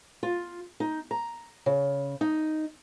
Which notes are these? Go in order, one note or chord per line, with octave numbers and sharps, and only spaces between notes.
F4
D#4
A#5
C#3
D#4